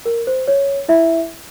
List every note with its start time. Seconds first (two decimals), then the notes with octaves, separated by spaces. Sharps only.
0.05 A#4
0.27 C5
0.48 C#5
0.89 E4 E5